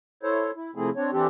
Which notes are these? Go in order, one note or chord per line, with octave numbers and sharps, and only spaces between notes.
E4 A4 C5 C#5
E4
C3 F3 A3 C4 E4 G#4
C4 D4 C#5
E3 C4 D4 G4 A4